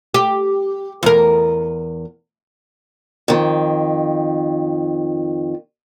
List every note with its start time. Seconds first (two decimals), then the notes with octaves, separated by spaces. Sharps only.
0.14 G4
1.03 E2 A#4
3.28 F2 D#3